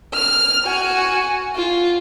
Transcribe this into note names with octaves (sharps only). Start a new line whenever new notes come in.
F6
F#4 G#5
F4